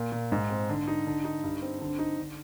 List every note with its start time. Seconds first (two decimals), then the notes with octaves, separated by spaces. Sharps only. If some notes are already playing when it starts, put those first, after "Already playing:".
Already playing: A#2
0.12 A#2
0.32 G#2
0.50 C4
0.69 D3
0.87 D#4
1.07 D3
1.24 D#4
1.43 G2
1.62 C4
1.81 D3
1.99 D#4
2.18 D3